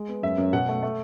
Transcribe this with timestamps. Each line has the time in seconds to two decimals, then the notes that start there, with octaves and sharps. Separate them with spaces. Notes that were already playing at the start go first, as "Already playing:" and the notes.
Already playing: G#3
0.09 B3
0.23 F#2 E5
0.38 F#2
0.53 B2 F#5
0.69 A3
0.82 A3